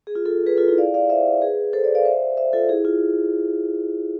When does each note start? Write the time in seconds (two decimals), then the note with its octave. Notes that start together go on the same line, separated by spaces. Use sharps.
0.07 G#4
0.15 F4
0.25 F4 A4
0.46 G#4 B4
0.57 F4 A4
0.68 E4 G#4
0.78 D5 F5
0.94 D5 F5
1.10 C5 E5
1.42 G#4 B4
1.73 A4 C5
1.84 B4 D5
1.95 D5 F5
2.05 C5 E5
2.37 C5 E5
2.53 F4 A4
2.69 E4 G#4
2.85 F4